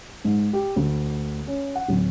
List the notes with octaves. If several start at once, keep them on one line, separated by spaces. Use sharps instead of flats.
G#2
G4
D2
C#4
F#5
D1